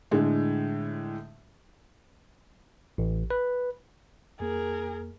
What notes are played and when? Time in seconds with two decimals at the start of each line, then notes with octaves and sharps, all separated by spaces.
0.11 A2 D3 G#3
2.98 A1
3.31 B4
4.40 F2 A#3 G#4 A#4